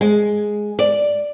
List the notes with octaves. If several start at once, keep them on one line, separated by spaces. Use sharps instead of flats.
G#3
D5